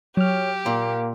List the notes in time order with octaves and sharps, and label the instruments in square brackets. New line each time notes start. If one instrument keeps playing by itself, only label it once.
[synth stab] F#3 F6 [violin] G4 [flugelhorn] C#5
[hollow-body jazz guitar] A#2 [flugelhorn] A#3